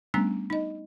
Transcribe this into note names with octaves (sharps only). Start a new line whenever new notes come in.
G3 A3 B3 C#4 D4 A#5
D#4 D#5